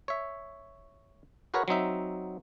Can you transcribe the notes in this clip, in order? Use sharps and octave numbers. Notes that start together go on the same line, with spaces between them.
C#5 E5
F#4 G#4 A#4 B4 C#5 F#5
F#3 C4 D#4 E5